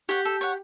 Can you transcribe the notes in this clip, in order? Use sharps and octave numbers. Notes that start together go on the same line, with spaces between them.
G4 C#5 F#5
A4
C#5 F#5